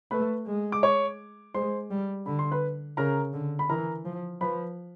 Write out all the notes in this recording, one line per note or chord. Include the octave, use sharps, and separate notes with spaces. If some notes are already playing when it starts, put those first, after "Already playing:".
A3 B4 B5
G#3
D6
C#5 C#6
G#3 C5 C6
G3
D3 B5
C6
B4 B5
C#3 A#4 A#5
D3
B5
E3 A#4 A#5
F3
F3 B4 B5